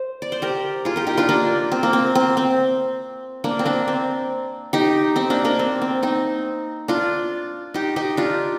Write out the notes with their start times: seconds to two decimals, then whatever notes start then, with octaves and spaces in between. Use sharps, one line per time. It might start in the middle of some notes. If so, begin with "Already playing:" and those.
Already playing: C5
0.22 D5
0.32 C5
0.42 G4 A#4
0.85 F4 G#4
0.96 G4 A#4
1.07 D#4 G4
1.18 D4 F4
1.29 A#3 D4
1.72 C4
1.83 A#3
1.93 C4
2.15 C4
2.37 C4
3.44 A#3 D4
3.59 C4
3.65 A#3 D4
3.88 C4
4.73 D#4 G4
5.16 C4 D#4
5.30 A#3 D4
5.45 A#3 D4
5.59 C4
5.82 C4
6.03 C4 D#4
6.88 D4 F4
7.74 D#4 G4
7.96 D#4 G4
8.17 D4 F4